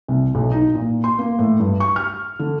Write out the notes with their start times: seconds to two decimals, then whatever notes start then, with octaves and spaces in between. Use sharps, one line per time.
0.08 C2
0.35 B1
0.52 D#4
0.74 A#2
1.04 C6
1.19 A#3
1.39 A2
1.59 G2
1.80 C#6
1.96 F6
2.39 D3